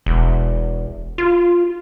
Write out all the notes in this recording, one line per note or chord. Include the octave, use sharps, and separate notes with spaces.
E1
F4